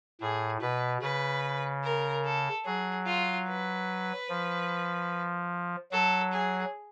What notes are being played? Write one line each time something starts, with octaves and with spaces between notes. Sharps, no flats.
A2 G#4
B2 B4
C#3 B4
A#4
A4
F#3 G#4
F4
B4
F3
F#3 A4
G#4